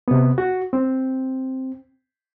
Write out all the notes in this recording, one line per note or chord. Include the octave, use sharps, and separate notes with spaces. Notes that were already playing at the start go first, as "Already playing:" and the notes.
C3 B3
F#4
C4